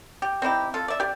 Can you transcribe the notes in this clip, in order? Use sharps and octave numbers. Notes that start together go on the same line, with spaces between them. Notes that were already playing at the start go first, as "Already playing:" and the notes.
G4
C4 D#4 E4 G4
F4 A4
D5 E5
G4 D5